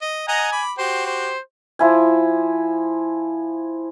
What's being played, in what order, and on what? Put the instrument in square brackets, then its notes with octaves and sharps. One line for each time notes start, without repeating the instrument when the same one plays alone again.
[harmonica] D#5
[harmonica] D#5 F#5 A#5 [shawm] G#5
[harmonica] B5 D6
[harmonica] F#4 G4 [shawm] C5
[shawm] C5
[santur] F3 E4 G#5